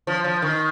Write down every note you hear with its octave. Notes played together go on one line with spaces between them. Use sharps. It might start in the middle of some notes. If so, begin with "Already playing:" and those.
F3
F3
D#3